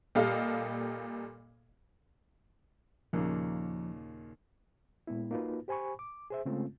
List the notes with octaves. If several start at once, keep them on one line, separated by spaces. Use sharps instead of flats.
A#2 G3 A4 D#5 F5 F6
D#2 A#2 C#3 F3
A#2 G#3 B3 E4
A#3 D#4 F4 F#4 B4
G4 C5 G#5 B5 C#6
D6
G#4 C5 E5
C#3 G#3 A3 C4 C#4 F4